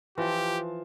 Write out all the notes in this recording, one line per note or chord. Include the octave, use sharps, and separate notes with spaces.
E3 F3 G4 E5 A5